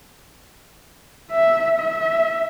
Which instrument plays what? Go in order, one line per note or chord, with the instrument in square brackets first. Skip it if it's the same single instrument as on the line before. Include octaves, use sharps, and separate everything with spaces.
[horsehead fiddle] E5
E5